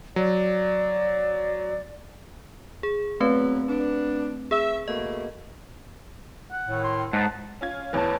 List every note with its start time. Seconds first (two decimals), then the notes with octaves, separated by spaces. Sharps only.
0.16 F#3 D5
2.83 G#4
3.20 F#3 A3 B3 C4 B4
3.67 B3 D4
4.51 G#4 E5
4.88 B2 A3 A#3 D#5
6.52 F#5
6.68 A2 D#3
6.84 C6
7.13 G#2 F#5 A5
7.61 C#4 F4 G#6
7.93 A1 E2 B4 C#5 A5